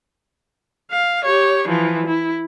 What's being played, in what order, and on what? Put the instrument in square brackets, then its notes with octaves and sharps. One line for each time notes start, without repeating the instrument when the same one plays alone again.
[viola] F5
G4 C#5
E3 F3
E4